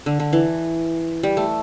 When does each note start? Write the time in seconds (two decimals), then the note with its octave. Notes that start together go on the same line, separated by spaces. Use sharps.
0.06 D3
0.20 D3
0.33 E3
1.23 G3
1.37 A3